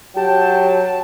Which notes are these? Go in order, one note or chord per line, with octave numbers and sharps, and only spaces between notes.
F#3 G4 G5 A5